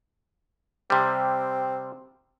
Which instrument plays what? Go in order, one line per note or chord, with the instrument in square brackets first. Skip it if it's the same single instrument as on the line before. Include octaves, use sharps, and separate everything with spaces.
[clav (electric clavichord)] C3 G3 [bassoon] C4